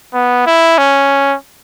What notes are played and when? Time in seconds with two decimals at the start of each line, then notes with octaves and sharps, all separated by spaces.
0.14 B3
0.46 E4
0.78 C#4